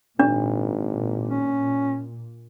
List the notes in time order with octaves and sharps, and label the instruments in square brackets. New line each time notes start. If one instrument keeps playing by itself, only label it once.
[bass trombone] G#1 [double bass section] A#2 [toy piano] D4
[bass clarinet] C#4